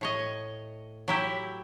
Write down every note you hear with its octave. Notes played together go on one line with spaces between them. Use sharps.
A2 C#5 D#5
F#3 E4 G4